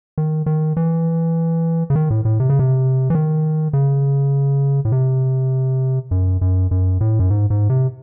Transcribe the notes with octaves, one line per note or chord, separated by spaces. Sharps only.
D#3
D#3
E3
C#3
D#3
A2
A2
C3
C#3
C3
E3
D#3
C#3
A2
C3
F#2
F#2
F#2
A2
F#2
G#2
G#2
C3